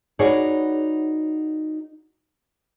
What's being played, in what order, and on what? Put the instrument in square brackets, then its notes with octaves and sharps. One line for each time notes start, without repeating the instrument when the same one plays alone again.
[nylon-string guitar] D#4 F#4 G#4 B4 C#5 D5